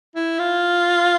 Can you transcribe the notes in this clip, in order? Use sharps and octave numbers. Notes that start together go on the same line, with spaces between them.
E4
F4